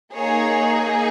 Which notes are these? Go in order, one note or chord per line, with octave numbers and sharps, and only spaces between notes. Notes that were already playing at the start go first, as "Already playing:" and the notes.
A#3 D#4 G#4 C#5